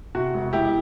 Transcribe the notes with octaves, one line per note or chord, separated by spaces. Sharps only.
C3 F#4
E1
E1 E4 G4